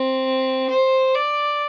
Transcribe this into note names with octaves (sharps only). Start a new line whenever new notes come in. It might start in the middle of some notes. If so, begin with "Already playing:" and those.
Already playing: C4
C5
D5